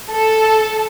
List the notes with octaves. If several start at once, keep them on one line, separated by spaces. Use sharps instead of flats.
A4